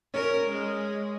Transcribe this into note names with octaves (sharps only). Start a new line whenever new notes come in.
C#4 A#4
G#3